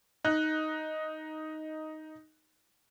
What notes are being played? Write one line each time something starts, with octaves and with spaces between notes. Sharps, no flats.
D#4 F#6